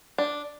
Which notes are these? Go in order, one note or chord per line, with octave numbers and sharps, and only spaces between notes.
D4